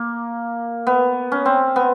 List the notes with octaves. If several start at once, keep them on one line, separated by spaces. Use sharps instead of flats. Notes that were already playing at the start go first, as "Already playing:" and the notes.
Already playing: A#3
B3
C#4
C4
B3